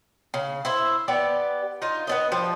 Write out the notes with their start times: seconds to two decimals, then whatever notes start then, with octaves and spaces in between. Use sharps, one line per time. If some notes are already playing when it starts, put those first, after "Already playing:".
0.34 C#3
0.65 E4 C5 E5
1.08 B3 G4 D5
1.82 D#4 F4
2.07 B3 D4 D#5
2.32 F3 G3